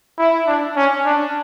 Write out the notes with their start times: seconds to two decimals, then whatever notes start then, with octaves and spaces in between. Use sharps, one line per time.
0.18 E4
0.47 D4
0.76 C#4
1.06 D4